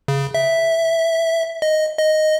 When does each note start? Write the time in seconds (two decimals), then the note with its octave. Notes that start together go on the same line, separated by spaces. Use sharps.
0.08 C#3
0.34 E5
1.62 D#5
1.98 D#5